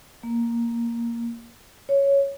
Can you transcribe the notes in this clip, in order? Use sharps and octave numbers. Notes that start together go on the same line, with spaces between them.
A#3
C#5